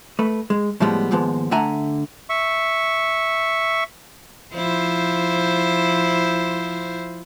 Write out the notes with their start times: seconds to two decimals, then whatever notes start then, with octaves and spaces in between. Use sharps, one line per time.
0.19 A3 B4
0.50 G#3
0.80 A2 F3 G3 G#3 B3
1.11 D#2 G#2 F3 G#3 B3
1.51 D3 A3 E5 F#5 G#5 A#5
2.30 E5 C#6
4.54 F3 E4 C5